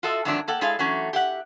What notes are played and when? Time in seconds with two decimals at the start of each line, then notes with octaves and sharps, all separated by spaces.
0.03 F4 F#4 A4 D#5 E5
0.25 F2 G#2 D#3 F#3 D4 E5
0.48 A#3 A4 F#5 G5
0.61 G#3 E4 G#4 A4 D5 F5
0.79 E3 F#3 A3 C#4
1.13 G4 E5 F#5